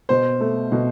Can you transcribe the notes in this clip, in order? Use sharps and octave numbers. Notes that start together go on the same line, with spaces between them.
B2 C5
A3
B2